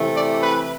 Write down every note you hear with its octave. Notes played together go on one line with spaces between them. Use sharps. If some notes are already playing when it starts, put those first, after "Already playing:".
Already playing: C3 E3 A3
D5
B4